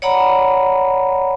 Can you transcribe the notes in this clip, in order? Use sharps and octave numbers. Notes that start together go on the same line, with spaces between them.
C#5 D5 F#5 A#5 B5